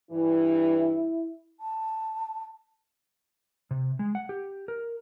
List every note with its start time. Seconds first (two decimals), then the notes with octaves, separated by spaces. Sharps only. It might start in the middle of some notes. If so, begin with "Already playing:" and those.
0.11 G2 E3 E4
1.59 A5
3.71 C3
3.99 G#3
4.15 F#5
4.29 G4
4.68 A#4